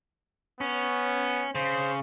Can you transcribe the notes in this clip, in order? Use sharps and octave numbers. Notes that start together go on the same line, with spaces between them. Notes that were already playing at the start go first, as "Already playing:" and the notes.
B3 C#4
C#3 C5